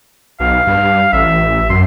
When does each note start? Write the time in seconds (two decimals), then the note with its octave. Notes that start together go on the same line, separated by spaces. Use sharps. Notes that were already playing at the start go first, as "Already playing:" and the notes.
0.40 B1 F5
0.67 G2
1.13 A1 E5
1.69 F#2 C6